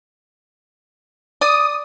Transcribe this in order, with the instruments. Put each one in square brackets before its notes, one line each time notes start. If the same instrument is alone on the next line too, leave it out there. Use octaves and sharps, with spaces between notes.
[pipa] D5 [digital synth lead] D#6